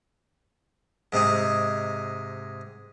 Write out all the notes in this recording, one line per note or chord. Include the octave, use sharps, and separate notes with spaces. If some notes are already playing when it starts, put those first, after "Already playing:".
G#2 C3 G#3 D#4